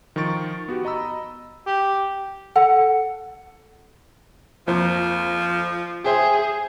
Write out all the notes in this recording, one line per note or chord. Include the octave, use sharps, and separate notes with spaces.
D#3 F3 F4 C#6 A6 D7
B3 F#4 G4
D#5 A#5 B5 E6
G4
A4 F#5
F2 F3 A#3 C5
G#4 C5 E5 G5